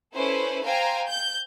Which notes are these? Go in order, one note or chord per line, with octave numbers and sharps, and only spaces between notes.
C#4 E4 A4 B4 C5
C5 F5 G5 G#5 A#5
G6